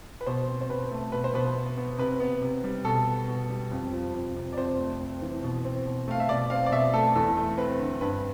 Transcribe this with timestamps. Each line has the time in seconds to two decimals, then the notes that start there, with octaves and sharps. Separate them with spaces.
0.21 B4
0.26 B2 C5
0.48 C4
0.61 C5
0.70 B2 B4
0.91 A3
1.12 B2 B4
1.24 C5
1.34 B2 B4
1.55 B3
1.77 B3
1.98 C3 B4
2.20 B3
2.41 C3
2.64 G3
2.85 B2 A4
3.07 B3
3.28 B2
3.49 G3
3.71 F2
3.93 F3
4.14 F2
4.35 C3
4.52 D5
4.57 F2 C5
4.78 A3
5.00 C4
5.22 E3
5.43 B2
5.65 C4
5.85 B2
6.08 A3 F5
6.20 E5
6.29 B2 D5
6.50 C4 F5
6.66 D5
6.72 B2 E5
6.93 A3 A4
7.16 E2 A4
7.37 A3
7.58 C4 B4
7.79 D3
8.01 G2 B4